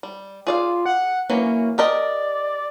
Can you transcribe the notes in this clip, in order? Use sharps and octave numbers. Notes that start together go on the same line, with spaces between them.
G3
F4 G#4 D5 F5
F#5
E3 F#3 A#3 C#4
G4 A#4 D5 D#5